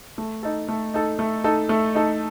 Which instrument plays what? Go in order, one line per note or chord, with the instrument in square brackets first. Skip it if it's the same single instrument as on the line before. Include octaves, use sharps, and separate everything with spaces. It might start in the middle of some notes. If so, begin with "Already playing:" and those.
[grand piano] A3
D#4 A4
A3
D#4 A4
A3
D#4 A4
A3
D#4 A4